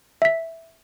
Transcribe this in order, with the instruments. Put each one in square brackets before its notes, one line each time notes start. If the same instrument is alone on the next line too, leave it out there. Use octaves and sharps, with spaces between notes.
[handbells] E5 B6